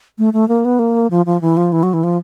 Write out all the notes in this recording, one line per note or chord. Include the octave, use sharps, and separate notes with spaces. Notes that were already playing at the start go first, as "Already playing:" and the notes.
A3
A3
A#3
B3
A#3
F3
F3
E3
F3
E3
F#3
E3
F3